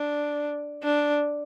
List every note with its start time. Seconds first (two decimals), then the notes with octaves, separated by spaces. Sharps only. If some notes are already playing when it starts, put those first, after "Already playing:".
Already playing: D4
0.84 D4